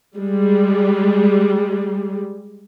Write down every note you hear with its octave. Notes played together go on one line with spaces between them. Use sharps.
G3 G#3